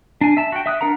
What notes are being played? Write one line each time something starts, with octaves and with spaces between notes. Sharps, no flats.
D4 G#5
E5 A5
F#4 G5
E5 D#6 F#6
D4 A#4 F#5 A#5